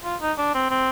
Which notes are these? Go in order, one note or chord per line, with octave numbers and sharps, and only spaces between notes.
F4
D#4
D4
C4
C4